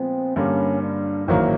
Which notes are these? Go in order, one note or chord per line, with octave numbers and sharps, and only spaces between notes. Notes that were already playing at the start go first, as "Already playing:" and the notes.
Already playing: A#2 F3 G#3 B3 C4
G2 D3 G3 A#3 C#4
D4
A1 G#2 D#3 F#3 A#3 E4